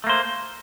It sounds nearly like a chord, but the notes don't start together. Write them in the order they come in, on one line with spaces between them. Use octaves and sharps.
A3 A#3 C5